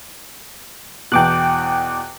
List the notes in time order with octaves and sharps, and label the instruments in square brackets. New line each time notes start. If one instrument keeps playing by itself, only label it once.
[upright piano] E2 B2 [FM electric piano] G5 D6 F#6